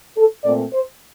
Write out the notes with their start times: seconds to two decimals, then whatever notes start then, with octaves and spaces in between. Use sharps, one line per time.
0.17 A4
0.45 A#2 A3 C4 D5
0.73 C5